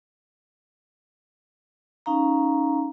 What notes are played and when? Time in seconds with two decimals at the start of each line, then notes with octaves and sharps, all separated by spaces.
2.06 C#4 D#4 F5 A#5